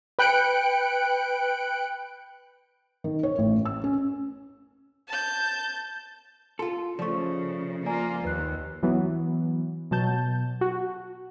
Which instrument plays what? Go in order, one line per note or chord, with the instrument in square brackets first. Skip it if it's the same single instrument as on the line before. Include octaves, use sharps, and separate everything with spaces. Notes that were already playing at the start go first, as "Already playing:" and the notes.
[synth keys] B4 G5 F#6 C#7 D7
[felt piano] D#3
C#5
A1
E6
C#4
[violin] A5 G6
[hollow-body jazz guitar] F4 A4 [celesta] C6
[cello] C#3 [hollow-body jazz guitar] F3 A3 [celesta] D5 C#6
[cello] A#3 F4 [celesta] D5 G#5 A#5
[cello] D#2 [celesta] B4 F#6
[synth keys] E3 F#3 B3
B2 F#3 A5 G6
F#4